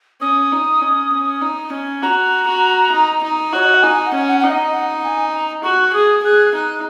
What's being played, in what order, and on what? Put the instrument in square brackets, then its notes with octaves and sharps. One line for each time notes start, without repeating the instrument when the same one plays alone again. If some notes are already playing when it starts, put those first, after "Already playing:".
[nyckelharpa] C#4 [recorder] D#6
[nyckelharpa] D#4
C#4
C#4
D#4
C#4
[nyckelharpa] F#4 [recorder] A#5
[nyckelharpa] F#4
D#4
D#4
[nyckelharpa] F#4 [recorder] C#5
[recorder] D#5
F#5
[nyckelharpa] D#4 [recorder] G#5
[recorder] F#5
[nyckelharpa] C#4
[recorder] F#5
[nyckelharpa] D#4 [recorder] F#5
[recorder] D#5
F#5
G#5
A#5
[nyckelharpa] F#4 [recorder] C#6
[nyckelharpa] G#4 [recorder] D#6
[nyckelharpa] G#4 [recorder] F#6
[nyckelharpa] D#4 [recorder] F#6